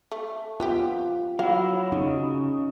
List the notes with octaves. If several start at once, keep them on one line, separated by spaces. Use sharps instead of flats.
A3
B3 C4 F4 G4
F#3 E4 F5
C#3 D#4